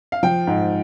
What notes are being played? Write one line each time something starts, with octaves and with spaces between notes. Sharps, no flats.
F5
F3 G5
G#2